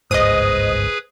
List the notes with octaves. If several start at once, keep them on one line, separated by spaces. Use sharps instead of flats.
G1 C#2 G#2 G#4 B4 C5 D#5 D#6